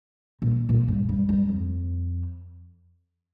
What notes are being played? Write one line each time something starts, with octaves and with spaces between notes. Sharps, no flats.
A#2
A#2
G2
G2
G2
F2